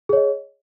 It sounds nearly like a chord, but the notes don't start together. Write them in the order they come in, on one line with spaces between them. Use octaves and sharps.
G#4 C#5 D#5